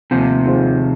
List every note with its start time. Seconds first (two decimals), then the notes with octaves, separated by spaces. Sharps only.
0.11 D#2 C3 F3
0.45 D#3 G#3 F4 C5